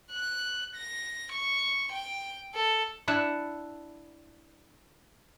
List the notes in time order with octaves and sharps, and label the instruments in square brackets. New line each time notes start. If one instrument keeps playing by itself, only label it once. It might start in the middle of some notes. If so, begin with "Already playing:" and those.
[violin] F#6
A#6
C#6
G5
A4
[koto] D4 E4 F#5 A5